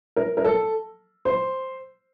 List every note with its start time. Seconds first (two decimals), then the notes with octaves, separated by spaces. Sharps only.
0.16 A#4
0.37 A#4
0.44 A4
1.25 C5